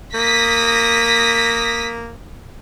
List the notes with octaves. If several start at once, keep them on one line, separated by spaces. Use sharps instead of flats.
A#3 D#6 A#6 B6